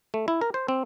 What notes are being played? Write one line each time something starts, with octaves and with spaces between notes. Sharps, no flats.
A3
E4
A#4
C5
C4